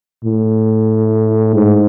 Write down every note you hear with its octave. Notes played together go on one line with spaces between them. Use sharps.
A2
G#2